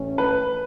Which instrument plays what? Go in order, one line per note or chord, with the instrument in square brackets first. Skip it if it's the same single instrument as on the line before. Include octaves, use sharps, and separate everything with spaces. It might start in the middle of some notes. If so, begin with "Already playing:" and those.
Already playing: [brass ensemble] A1 A2 A3 C#4
[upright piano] B4